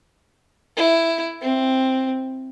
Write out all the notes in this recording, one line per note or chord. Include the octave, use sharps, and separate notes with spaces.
E4
C4